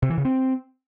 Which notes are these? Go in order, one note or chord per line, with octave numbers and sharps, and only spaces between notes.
C3
E3
C#3
C4